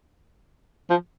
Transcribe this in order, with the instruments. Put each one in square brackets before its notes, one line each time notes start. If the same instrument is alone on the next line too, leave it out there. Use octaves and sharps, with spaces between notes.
[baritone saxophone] F3